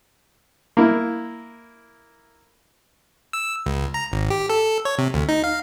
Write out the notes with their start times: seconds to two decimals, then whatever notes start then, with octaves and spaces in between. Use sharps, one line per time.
0.77 A#3 E4
3.33 E6
3.66 C#2
3.94 A#5
4.12 G#1
4.30 G4
4.50 A4
4.85 C#5
4.98 C3
5.14 D2
5.29 D#4
5.44 F5